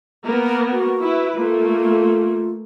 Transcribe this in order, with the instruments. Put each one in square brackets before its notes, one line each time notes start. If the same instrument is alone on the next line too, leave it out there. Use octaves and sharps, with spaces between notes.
[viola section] A#3 B3 A#4
[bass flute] F#4
[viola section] E4 B4
[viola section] A3 A#3 [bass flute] F4